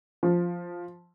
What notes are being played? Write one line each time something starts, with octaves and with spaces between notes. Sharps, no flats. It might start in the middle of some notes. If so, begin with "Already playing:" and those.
F3